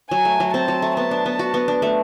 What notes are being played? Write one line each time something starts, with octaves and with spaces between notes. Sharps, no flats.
F#3 G#5
A3
F#3
C4 A5
F#3
A3
B3 A5
D4
B3
F#4
B3
D4
A3